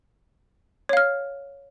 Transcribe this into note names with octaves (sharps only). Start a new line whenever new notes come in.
C#5 F5 F6